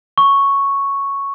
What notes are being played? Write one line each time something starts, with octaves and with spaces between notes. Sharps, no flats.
C#6